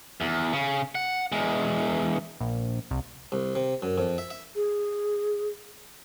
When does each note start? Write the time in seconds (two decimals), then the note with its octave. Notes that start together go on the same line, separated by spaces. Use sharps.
0.21 E2
0.53 C#3
0.95 F#5
1.32 E2 G#3
2.40 A#1
2.91 C2
3.32 C2
3.55 C3
3.82 F#2
3.98 F2
4.18 E5
4.30 E5
4.56 G#4